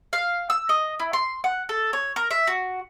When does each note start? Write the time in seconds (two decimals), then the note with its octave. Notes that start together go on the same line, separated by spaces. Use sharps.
0.13 F5
0.50 E6
0.69 D#5
0.99 E4
1.13 C6
1.44 F#5
1.69 A4
1.93 C#5
2.16 A#4
2.31 E5
2.47 F#4